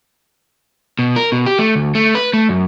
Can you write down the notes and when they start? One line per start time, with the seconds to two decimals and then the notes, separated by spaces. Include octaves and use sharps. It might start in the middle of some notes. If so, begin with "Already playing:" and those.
0.99 B2
1.16 A#4
1.32 B2
1.46 G4
1.59 A3
1.76 D2
1.95 A3
2.15 B4
2.34 A3
2.49 F#2